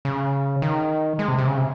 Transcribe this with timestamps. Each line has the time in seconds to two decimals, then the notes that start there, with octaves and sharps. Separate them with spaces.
0.05 C#3
0.62 D#3
1.19 G#3
1.28 C3
1.38 C3
1.47 C#3
1.57 C3